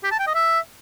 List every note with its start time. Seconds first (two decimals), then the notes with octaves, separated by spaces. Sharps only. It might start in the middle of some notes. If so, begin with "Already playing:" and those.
0.04 G4
0.12 A5
0.19 G5
0.27 D#5
0.35 E5